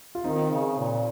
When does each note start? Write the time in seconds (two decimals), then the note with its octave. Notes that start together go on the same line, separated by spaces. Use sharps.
0.15 F4
0.24 D#3 C4 D#4
0.51 C#3
0.78 A#2